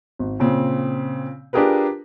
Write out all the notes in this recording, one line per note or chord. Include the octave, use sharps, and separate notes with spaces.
G#1
A#2 C#3 C4
D4 F4 G4 G#4 A#4 B4